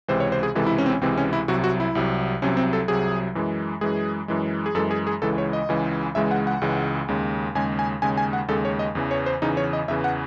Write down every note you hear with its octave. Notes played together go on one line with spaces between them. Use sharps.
C#2 C3 E3 G#3 C5
C#5
C5
G#4
C#2 C3 E3 G#3 A4
E4
C#4
C4
C#4
C#2 C3 E3 G#3 C4
C#4
E4
C2 C3 F#3 F#4
F#4
E4
C2 C3 F#3
C2 C3 F#3 C#4
C4
A4
C2 C3 F#3 G#4
F#2 E3 G#3
F#2 E3 G#3 G#4
F#2 E3 G#3
G#4
F#2 E3 G#3 A4
G#4
G#4
C#2 C#3 E3 G#3 A4
C#5
D#5
C#2 C#3 E3 G#3
C#2 C#3 E3 G#3 E5
F#5
F#5
C#2 C#3 E3 G#3
D#2 C#3 G#3
D#2 C#3 G#3 G#5
G#5
D#2 C#3 G#3 G#5
G#5
F#5
D#2 C#3 G#3 A4
C#5
D#5
E2 C#3 E3
C#5
C5
E2 C#3 E3 D#4
C#5
D#5
E2 C#3 E3 E5
F#5